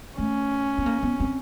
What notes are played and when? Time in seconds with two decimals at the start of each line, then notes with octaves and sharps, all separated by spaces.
0.18 A3 C#4
0.78 B3
0.86 A#3
1.03 B3
1.20 C4